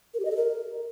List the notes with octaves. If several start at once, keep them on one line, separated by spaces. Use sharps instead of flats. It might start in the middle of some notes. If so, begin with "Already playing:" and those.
A#4
G4
D#5
A4
A#4